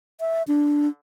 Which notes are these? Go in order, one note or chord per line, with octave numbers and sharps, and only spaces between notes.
E5
D4